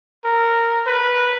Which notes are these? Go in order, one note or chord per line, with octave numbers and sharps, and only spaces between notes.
A#4
B4